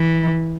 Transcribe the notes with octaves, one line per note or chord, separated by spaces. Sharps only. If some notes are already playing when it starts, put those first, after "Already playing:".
Already playing: E3